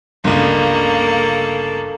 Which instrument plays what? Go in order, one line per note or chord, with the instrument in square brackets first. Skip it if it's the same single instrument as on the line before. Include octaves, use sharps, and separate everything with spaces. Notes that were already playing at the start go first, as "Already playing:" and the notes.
[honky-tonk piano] G1 C#2 [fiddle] A#3 A4